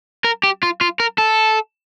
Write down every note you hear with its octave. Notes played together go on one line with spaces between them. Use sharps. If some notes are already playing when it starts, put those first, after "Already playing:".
A#4
G4
F4
F4
A#4
A4